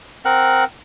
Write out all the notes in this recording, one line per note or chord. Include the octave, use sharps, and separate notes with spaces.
C4 A#4 F#5